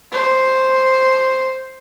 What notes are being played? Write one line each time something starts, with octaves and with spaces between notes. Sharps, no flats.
C5